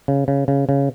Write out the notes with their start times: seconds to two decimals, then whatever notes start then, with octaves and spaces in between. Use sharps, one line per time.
0.08 C#3
0.28 C#3
0.48 C#3
0.69 C#3